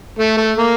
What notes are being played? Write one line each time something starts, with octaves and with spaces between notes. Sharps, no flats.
A3
A3
A#3